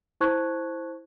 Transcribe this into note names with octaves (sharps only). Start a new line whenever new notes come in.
E4 C5 A5 C#6 F#6 G#6